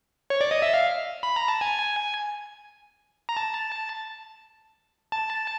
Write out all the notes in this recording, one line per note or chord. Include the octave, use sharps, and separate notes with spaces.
C#5
D5
D#5
E5
F5
B5
A#5
A5
G#5
A#5
A5
A5